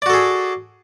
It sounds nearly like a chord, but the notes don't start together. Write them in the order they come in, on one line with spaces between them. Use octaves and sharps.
D5 F#4 A4 G#4